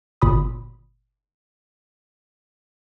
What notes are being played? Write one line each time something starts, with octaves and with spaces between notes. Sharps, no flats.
G1 A#2 B5 D#6